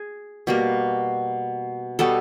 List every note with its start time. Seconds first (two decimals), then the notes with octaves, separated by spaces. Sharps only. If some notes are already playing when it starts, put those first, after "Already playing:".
Already playing: G#4
0.47 B2 G3 A#3
1.99 B2 G3 B3 A4